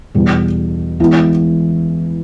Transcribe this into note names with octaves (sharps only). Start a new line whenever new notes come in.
E2 B2 G3
E3 G#3 B3 E4